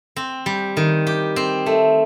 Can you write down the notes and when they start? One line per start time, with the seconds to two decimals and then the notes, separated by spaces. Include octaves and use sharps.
0.16 C4
0.46 G3
0.77 D#3
1.07 G4
1.36 C4
1.66 A3